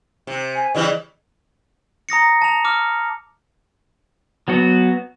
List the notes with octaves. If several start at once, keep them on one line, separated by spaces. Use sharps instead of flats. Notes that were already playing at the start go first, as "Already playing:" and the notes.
C3
G#5
C#3 E3 G3 D#5
A#5 D#6 A#6 C#7
A5 F7
D6 F6
F#3 B3 F#4